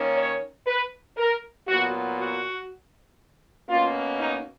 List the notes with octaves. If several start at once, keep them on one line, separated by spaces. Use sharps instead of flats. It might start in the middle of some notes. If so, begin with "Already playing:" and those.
Already playing: D#3 A#3 C#4
C#5
B4
A#4
A#2 F#3 B3 F#4
F#4
B2 A#3 C#4 F4
D#4